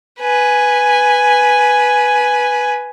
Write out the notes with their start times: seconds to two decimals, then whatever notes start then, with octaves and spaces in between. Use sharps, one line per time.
0.20 B4 G#5